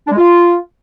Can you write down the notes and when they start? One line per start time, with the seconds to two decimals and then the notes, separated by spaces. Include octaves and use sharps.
0.06 D4
0.12 G#3
0.17 F4